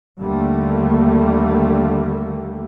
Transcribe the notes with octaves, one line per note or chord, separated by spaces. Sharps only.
D#2 D3 G3 A3 A#3